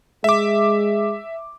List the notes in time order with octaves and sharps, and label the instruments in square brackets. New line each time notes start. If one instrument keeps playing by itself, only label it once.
[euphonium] G#3 [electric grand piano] E5 D6